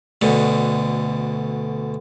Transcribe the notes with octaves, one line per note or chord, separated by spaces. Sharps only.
D2 B2 D3